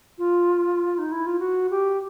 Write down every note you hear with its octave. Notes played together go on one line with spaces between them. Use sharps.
F4
D#4
E4
F4
F#4
G4